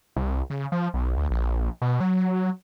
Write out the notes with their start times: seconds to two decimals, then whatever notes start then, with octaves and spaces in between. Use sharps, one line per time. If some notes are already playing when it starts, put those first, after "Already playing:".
0.16 C2
0.50 C#3
0.72 F3
0.94 B1
1.17 D2
1.31 A#1
1.82 B2
2.00 F#3